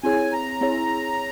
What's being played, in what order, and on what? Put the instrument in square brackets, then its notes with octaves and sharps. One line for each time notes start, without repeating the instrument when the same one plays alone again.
[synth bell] C4 E4 G#4 C#5 [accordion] G#5
[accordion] A#5
[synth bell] C4 E4 G#4 C#5